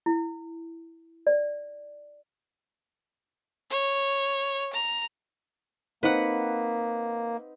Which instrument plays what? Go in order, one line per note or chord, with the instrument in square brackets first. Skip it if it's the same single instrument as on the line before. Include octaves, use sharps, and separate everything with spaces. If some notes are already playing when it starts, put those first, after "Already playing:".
[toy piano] E4
D5
[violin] C#5
A#5
[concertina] A#3 [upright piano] C4 D#4 [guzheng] B4 F#5